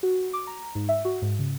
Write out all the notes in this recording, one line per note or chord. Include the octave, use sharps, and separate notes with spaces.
F#4
D6
A#5
G#2
E5
F#4
G#2
C#3